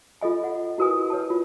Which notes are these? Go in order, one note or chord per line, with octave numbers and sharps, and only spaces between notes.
F4 A4 D#5 G#5
D#5 F#5
E4 F#4 A#4 B4 G#5 D#6
B4 C#5 G5 A5
F4